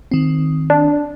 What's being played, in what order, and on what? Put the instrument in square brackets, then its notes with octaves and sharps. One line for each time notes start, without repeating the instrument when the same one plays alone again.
[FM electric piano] D#3 C4
[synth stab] D4